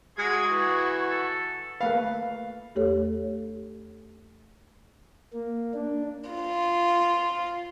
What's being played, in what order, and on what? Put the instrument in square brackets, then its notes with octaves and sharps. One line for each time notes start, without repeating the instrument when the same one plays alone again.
[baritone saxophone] G#3 [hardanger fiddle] F#4 [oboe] G#4 [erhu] G#6
[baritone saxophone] E3 [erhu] C#6
[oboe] A4
[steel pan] A3 A#3 B4 [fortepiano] F5
[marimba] E2 A3 G4 A4 C#5
[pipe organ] A#3
D4
[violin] F4